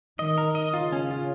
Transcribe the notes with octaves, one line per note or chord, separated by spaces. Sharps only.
D#3 D#5
A#4
D#5
C#3 F4
C#4
F4